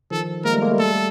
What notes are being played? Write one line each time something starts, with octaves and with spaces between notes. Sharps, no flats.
D#3 F3 A4
G#3 A#3 A#4
G3 A3
G#3 A#3
G3 A3
A4